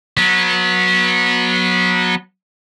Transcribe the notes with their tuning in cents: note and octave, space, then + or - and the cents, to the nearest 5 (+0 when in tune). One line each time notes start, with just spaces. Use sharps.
F#3 -20 B3 -25